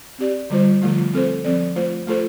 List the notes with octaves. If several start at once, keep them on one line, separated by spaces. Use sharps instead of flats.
C4 G4 D5
D3 G3 F4 C5
D3 F3 A3 F4
C4 A4 C5
F3 C4 A4 D5
A3 F4 C5
A3 F4 A4 C5